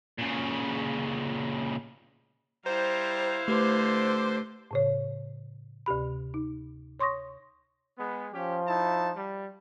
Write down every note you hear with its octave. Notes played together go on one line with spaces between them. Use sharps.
A#2 C#3
G3 E4 C5 F5 A#5
D3 A3 G4 B4 C6 D6
A2 C#3 C#5
D2 C3 G4 B5
D#4
C#5 C6 C#6 D#6 A#6
G#3 B3
F3 C#4 G4
D#4 E4 A5
G3